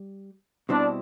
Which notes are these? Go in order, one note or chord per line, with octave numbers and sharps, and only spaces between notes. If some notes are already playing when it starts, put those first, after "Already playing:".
Already playing: G3
B2 G3 C4 D4 E4